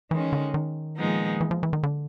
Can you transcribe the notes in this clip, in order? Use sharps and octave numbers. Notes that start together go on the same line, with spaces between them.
D#3 E3 G#3 C#4
D3
D#3
A#2 F3 G#3 B3 D#4
E3
F3
E3
D#3
D3